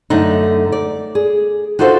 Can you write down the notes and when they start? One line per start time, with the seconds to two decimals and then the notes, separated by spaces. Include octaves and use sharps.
0.10 F#2 D3 A3 D4 D#4
0.72 D5
1.15 G#4
1.79 D4 D#4 F4 F#4 A4 C5